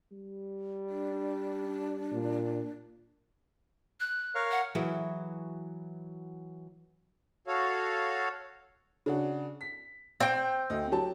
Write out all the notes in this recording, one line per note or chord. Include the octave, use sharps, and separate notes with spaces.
G3
D4
A#2
F#6
A#4 C#5 F5
F#5
E3 F#3 E4 F#4 G#4
F#4 A4 C#5 F5
C#3 D4 F#4
B6
C4 G5
D2 D#5
F#3 G4 A5